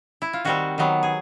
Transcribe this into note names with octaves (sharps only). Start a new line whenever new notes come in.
E4
F4
D#3 G3 C4 F#4
D#3 F#3 B3
G#4